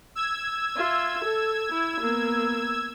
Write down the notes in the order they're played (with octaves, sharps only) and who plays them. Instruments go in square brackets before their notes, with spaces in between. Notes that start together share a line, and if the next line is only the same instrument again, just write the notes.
[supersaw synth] E6 G#6
[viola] F4 E5
A4
E4
A#3 B3